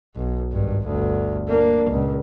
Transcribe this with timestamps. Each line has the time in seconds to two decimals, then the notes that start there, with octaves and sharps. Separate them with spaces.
0.16 B1
0.52 G#1 G2
0.86 G1 D2
1.48 A#3 D4
1.90 C#2 A#2